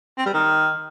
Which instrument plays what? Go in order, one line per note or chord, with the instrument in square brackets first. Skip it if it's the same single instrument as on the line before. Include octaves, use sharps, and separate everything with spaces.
[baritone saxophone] C4
G3
D#3